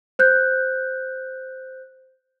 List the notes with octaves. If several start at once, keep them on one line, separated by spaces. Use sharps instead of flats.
C5 F#6 G6